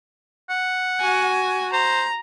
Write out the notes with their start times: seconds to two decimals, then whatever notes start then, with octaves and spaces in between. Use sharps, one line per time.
0.49 F#5
1.00 F#4 G#5
1.73 C5 A#5